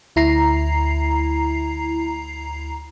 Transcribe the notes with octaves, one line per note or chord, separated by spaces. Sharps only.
D2 E4 A#5 C7